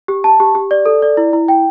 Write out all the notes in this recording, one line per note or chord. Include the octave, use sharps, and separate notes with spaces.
G4
A5
G4
G4
D5
A4
D5
E4
E4
G5